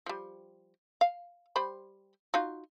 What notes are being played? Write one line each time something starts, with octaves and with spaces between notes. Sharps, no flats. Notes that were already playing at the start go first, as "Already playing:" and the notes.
F3 G3
F5
G3 C5 B5
D#4 F4 F#4